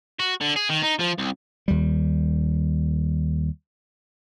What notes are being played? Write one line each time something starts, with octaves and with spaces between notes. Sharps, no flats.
F#4
D3
G#4
D#3
D#4
F3
C2
D#2 G3